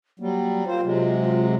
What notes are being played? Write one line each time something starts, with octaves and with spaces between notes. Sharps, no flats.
F#3 G3 A#3
A#3 C4 F4 C5
C3 F#3 G#3
F4